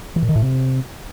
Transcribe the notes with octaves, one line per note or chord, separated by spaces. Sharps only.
E3
A#2
D#3
A2
C3